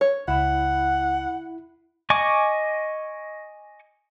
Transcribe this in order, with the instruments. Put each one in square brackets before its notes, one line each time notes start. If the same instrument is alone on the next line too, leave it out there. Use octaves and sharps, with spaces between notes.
[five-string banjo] C#5
[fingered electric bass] C#2 [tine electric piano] E4 B5 [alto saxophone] F#5
[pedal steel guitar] D#5 G#5 C#6 D6